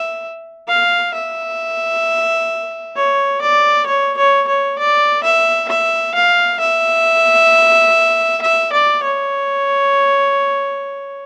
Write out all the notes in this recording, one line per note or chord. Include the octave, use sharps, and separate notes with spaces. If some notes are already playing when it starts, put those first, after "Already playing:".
Already playing: E5
F5
E5
C#5
D5
C#5
C#5
C#5
D5
E5
E5
F5
E5
E5
D5
C#5